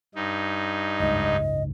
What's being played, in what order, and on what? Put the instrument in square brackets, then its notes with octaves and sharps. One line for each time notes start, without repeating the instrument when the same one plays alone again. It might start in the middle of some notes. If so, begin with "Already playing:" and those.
[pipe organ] G2 D#4
[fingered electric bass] F#1 C#2 G#2 [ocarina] D#5